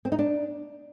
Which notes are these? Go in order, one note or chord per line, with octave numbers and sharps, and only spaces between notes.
C4
D#4
D4